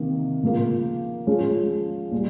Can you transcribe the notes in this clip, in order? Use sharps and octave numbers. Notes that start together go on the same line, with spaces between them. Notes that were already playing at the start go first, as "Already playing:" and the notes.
Already playing: C3 D#3 A#3
C#3 F3 A#3
F3 G#3 C#4 G#4
A#2 G3